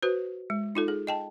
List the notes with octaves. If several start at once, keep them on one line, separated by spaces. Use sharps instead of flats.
F#4 B4 C5
G#3
D#4 F4 A4
G#4
D#5 G5 A5